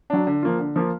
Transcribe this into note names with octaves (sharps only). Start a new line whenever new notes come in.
F#3 D4
D3
F3 A#3 F4
D3
F3 A#3 F4